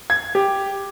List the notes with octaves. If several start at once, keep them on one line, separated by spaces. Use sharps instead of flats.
G#6
G4